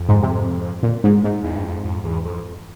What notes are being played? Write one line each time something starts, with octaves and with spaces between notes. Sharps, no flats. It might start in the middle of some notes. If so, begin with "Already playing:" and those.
Already playing: F2
G#2
C3
A#2
G#2
G#2
E2
G2
F2
F2
E2
F2